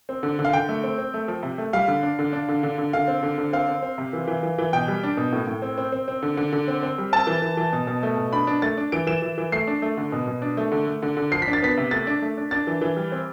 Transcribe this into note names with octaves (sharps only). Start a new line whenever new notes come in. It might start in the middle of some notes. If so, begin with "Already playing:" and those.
C4
D3
D3
F5
D3 G5
A3
C4
C4
A3
F3
C3
A3
G3 F5
D3
D4
D3
D4
D3
D3
D3
D3 F5
C4
D3
D3
C4 F5
C4
C4
C3
E3
E3
E3
E3
B2 G5
G3
D4
B2
A2
A2
C4
C4
C4
C4
D3
D3
D3
C4
C4
G3
C4 A5
E3
E3
E3
B2
B2
A3
B2
D4 B5
D4
A3 A6
D4
E3 D7
E3 E7
E3
E3
A3 C7
D4
A3
D3
B2
B2
D4
A3
D3
A3
D3
D3
F3 C7
B6
D4
A6
B3 B6
C3
A3 A6
D4
A3
D4
D4 A6
E3
E3
G3
C4